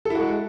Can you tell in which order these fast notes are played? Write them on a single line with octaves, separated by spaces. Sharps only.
A4 E4 F#4 G#3